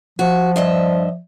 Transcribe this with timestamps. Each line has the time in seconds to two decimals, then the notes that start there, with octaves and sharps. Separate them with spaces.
0.19 F3 F#4
0.56 G2 D#5 E5